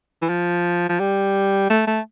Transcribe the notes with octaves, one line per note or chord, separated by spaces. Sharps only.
E3
F3
F3
G3
A3
A3